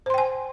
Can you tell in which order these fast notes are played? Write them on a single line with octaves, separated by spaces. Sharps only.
C5 C6 G5 G#5